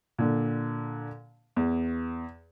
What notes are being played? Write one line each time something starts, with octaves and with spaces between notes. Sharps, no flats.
A#2 D3
E2